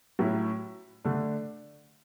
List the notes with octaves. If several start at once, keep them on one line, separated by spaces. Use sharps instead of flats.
A2 F#3 C#4 E4
D3 A3 D4